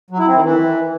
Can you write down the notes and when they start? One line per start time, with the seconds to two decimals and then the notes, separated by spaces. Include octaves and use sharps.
0.10 F#3
0.19 E4
0.27 C4
0.35 D#3
0.43 E3